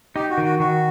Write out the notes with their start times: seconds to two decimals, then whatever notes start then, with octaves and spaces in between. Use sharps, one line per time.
0.16 D#4 G4
0.30 F#4
0.38 D#3
0.45 F#4
0.60 D#3 F#4